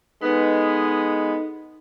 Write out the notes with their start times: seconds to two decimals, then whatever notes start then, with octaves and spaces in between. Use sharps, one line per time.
0.22 G#3 B3 D#4 A4 D#5